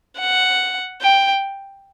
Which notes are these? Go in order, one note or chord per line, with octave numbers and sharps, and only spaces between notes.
F#5
G5